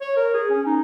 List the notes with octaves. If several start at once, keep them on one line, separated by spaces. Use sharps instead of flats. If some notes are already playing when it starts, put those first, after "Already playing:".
C#5
A#4
G#4
C#4
D#4